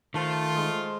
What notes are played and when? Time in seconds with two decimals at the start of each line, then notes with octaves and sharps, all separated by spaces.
0.14 D#3 A3 F4 C5 A5
0.55 G#3